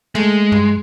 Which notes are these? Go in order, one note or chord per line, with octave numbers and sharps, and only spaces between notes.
G#3 A3
G2